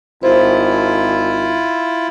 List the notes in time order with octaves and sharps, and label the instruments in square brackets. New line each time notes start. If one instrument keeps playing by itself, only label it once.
[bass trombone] G#1 [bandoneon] E4 F4 [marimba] C5